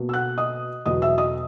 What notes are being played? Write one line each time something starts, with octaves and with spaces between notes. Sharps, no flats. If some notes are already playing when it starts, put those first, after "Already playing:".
Already playing: B2 A#3
E6
F#5 F#6
D#5 D#6
E2 B2 F#3 D#5 D#6
E5 E6
D#5 D#6